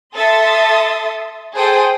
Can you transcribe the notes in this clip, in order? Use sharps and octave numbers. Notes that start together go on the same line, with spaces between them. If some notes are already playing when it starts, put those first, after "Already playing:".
A4 E5 C6 D#6 A6
G#4 A4 C5 G5 G#5 D#6